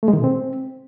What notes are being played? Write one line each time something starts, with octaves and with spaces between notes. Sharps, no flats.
A3
G#3
D#3
B2
C4